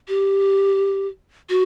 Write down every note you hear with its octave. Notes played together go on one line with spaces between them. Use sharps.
G4
F#4